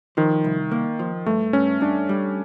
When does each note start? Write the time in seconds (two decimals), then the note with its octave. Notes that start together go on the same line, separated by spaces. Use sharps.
0.17 D#3 F3
0.44 C2
0.72 A#3
0.99 F3
1.26 G2 A3
1.53 G2 C#4
1.81 G2 D4
2.09 G3